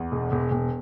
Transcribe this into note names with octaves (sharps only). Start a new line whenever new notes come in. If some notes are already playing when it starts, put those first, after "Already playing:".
Already playing: E2
E1
E1
E1